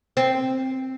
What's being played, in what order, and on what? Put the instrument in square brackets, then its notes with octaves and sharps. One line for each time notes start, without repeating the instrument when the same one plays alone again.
[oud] C4